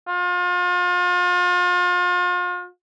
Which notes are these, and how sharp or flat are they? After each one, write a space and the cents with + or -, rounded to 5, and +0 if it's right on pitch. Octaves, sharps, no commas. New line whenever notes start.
F4 +40